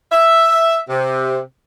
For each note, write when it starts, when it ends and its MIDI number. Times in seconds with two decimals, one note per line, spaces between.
0.12 0.78 76
0.89 1.40 48